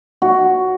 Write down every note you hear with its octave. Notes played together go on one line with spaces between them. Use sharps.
F#4